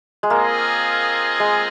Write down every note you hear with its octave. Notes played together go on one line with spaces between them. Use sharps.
G#3
A#3 C4 F4 G#4 D#5
G#3